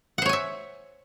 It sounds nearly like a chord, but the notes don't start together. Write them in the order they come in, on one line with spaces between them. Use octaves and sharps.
F#5 C5 C#5 G#5 E5